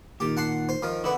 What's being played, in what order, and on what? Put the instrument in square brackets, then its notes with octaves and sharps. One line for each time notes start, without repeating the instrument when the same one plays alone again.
[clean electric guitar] A#2 D#3 [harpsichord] G4
[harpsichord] F#5 A5 C6
C5
D#3 F3
[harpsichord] D3 B3 [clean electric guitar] E4